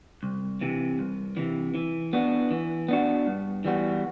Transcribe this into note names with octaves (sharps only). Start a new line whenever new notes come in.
C2
C3 E3
C2
C3 E3
E3
B3 D4 F#4
E3
B3 D4 F#4
G2
E3 G3 B3 F#4